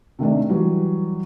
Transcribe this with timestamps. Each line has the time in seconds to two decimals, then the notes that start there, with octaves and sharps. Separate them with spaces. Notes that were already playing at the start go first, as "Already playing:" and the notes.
0.19 C3 D#3 A3 D4
0.49 E3 F#3 G3